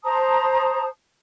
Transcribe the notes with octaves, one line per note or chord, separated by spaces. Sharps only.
C5 A5 A#5 D#6